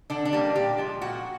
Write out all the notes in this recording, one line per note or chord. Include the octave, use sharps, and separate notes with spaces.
D3 D4
D4
G3 A#3
A#2 G4
F3 G#3
A#2 F#4